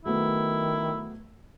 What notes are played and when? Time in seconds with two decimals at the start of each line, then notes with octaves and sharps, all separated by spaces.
0.05 D#3 F#3 A3 B3 E4